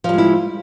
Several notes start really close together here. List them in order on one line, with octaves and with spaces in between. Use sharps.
F3 G3 G#3 E4